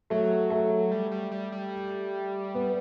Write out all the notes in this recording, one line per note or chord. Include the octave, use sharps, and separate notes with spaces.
F#3 A3
A3
G3
G3
G3
G3
B3